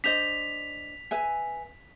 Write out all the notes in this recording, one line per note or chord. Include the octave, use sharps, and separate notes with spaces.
D4 C5 D#5 B6 F7
B4 E5 G#5